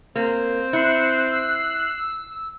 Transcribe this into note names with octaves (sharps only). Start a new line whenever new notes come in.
A#3 C4
E4 F#6 C7 C#7
E6